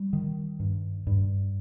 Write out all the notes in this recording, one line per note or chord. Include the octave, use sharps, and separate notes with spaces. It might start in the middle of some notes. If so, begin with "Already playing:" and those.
Already playing: G3
D#3
G2
G2